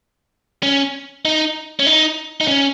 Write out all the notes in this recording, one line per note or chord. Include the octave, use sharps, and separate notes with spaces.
C#4
D#4
C#4
D#4
D#4
C#4